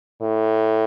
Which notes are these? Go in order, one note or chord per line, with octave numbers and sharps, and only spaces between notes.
A2